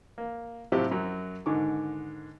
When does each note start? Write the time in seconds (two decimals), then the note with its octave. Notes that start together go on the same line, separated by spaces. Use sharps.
0.18 A#3
0.72 A2 C3 F#3 C4 F4 G4
0.91 F#2 F#3
1.46 G#2 D3 D#3 C#6 D6